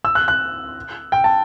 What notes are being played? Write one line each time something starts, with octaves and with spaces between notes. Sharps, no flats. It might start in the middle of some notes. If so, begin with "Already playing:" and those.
E6
F#6
F#6
G5
A5